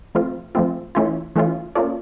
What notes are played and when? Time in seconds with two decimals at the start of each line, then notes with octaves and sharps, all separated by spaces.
0.15 F3 A3 C4 F4
0.55 F3 A3 C4 F4
0.95 E3 A3 C#4 F4
1.36 E3 A3 C#4 F4
1.75 A#3 C#4 F4 A4 D5